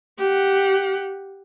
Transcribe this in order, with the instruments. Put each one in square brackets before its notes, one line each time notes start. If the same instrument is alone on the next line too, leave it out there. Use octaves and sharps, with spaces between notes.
[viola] G4 F#5